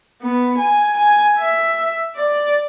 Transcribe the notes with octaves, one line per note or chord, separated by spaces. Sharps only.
B3
G#5
G#5
E5
D5